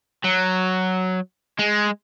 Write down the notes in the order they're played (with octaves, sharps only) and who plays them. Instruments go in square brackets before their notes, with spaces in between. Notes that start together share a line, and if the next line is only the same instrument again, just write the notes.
[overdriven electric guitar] F#3
G#3